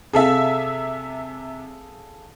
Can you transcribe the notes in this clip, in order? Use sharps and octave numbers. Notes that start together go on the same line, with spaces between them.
C3 G#4 A4 E5 F5